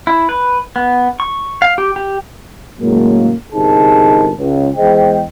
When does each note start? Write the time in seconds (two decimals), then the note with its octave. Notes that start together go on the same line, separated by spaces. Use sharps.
0.07 E4
0.29 B4
0.76 B3
1.20 C#6
1.62 F5
1.78 G4
1.96 G4
2.80 A2 C#3 F#3 G#3 A#3
3.53 G1 C3 D#4 G#4 A#4 A5
4.37 C#2
4.77 E2 G#3 G#4 C5 D#5 G5